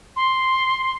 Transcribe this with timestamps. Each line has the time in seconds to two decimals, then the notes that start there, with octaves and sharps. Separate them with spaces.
0.16 C6